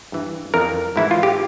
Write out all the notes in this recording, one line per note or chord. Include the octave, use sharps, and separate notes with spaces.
G2 E3
F2 E3 A#4
G#2 E3 E4
F4
G4